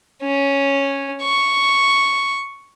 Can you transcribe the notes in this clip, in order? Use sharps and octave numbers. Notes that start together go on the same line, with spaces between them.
C#4
C#6